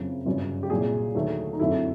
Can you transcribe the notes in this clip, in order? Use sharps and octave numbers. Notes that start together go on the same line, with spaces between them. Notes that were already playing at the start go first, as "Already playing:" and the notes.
Already playing: F#1 F2 C#3 F3
G1 F#2 C#3 F#3
G4
C2 A#2 F#3 G#4
D#2 D3 F#3 A3
D#4
F#1 F2 D3 F#3 A3 E4